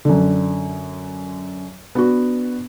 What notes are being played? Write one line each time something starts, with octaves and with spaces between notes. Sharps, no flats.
F#2 D3
B3 D4 F#4